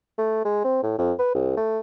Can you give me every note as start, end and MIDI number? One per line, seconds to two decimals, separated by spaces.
0.18 0.45 57
0.45 0.63 56
0.64 0.80 60
0.83 0.94 45
0.98 1.13 41
1.19 1.30 71
1.34 1.54 36
1.57 1.80 57